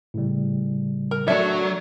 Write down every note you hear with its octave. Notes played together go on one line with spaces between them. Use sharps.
A2 C#3 G3
A#4
F#3 A3 D4 E5